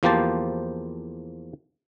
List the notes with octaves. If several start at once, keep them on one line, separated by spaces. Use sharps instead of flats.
E2 F3 A#3 G4 C5 A5